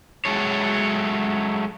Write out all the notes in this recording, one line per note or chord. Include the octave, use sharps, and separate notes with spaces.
F#3 G#3 A3 A4 C#5